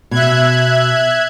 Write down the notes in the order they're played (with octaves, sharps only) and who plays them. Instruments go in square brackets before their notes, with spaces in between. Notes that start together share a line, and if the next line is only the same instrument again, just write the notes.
[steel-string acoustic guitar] B2 [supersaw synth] E5 F#6 G#6